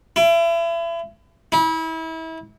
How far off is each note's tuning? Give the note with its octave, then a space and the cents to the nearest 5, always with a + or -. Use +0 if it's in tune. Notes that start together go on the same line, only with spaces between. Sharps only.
E4 +35
E4 -30